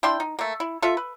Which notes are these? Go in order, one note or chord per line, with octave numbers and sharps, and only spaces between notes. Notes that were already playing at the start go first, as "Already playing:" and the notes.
D4 E4 G5 C6
D#4
A3 A#3
E4
F4 A4 E5
B4